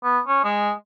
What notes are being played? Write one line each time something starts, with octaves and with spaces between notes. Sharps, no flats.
B3
C#4
G#3